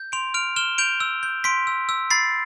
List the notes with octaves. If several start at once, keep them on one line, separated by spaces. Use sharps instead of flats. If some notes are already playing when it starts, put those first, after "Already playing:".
Already playing: G6
C6 D7 F7
F6 D7 F7
F6 E7 G7
G6 D7 F7
E6
G6
C6 B6 D7
E6
E6
B5 A6 C7